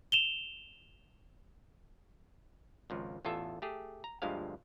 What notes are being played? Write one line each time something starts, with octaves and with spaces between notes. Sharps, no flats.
E7 F7 G7
G#1 C#2 F3
A1 E2 F4 A4 E5
A3 G4 G#4
A#5
G1 D2 G2 F3 G#3 F5